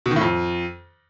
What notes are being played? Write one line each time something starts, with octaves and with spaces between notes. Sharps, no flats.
B2
D#3
A2
F2